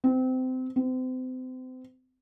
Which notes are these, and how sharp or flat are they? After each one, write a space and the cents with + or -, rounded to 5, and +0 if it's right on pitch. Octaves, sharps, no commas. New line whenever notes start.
C4 -25
C4 -35